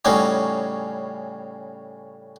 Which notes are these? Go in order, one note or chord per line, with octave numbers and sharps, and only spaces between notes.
A2 C#3 G3 C#4 D#4 F#4